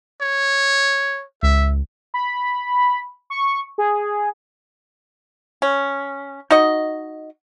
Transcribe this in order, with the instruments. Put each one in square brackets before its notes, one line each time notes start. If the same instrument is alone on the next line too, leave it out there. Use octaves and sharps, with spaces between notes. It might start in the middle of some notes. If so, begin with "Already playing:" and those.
[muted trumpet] C#5
[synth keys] C#2 [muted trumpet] E5
[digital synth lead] B5
C#6
G#4
[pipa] C#4
D#4 F#4 D#5